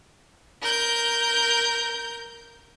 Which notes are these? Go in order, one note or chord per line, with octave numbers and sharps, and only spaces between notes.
A#4 G6